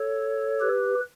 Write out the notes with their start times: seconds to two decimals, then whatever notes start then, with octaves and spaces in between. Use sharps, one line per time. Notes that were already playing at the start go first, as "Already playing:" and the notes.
Already playing: A4 C#5
0.61 G4 B4